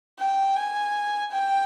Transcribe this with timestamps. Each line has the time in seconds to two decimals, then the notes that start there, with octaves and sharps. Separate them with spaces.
0.19 G5
0.56 G#5
1.31 G5